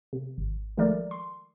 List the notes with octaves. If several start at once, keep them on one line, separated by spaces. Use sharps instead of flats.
C3
G#1
D#3 F3 G#3 A3 A#4 D5
C6